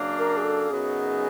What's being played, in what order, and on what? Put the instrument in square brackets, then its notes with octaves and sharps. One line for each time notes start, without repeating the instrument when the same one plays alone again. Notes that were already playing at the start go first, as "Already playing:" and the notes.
Already playing: [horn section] F#2 C#3 F#3 A#3 D4
[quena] A#4
G#4
A4
[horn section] F#2 C#3 F#3 B3 D#4 [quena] G#4